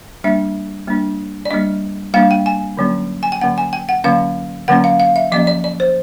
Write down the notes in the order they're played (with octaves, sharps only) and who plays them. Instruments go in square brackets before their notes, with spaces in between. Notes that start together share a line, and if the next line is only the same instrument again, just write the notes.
[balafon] G3 A#3 D4 E5
G3 A#3 D4
D5
G3 A#3 D4 D#5
G3 A#3 D4 F5
G5
G#5
D3 F#3 A#3 C#4
G#5
G5
D3 F#3 A#3 C#4 F#5
G#5
G5
F#5
D3 F#3 A#3 C#4 F5
D3 F#3 A#3 C#4 F#5
F5
F5
E5
F3 A#3 C#4 D#5
D5
D5
C5